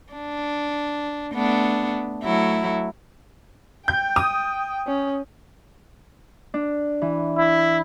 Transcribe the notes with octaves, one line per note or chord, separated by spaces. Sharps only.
D4
A3 B3 D4
F#3 A3 E4
G5 G6
D#6
C#4
D4
E3
E4